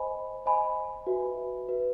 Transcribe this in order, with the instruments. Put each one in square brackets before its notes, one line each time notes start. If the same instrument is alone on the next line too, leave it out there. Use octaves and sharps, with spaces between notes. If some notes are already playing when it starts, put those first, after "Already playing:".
Already playing: [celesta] C5 D#5 G#5 B5
C5 D#5 G#5 B5
F#4 B4 E5
F#4 B4 E5